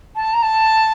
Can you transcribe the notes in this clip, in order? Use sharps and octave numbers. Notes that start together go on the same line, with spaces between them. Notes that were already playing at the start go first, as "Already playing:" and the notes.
A5
A#5
A5